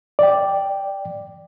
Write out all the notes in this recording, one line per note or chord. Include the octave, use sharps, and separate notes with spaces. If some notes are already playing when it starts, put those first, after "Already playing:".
D5 G5